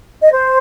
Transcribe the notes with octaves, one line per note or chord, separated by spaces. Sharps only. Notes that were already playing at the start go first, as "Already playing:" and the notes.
D#5
C5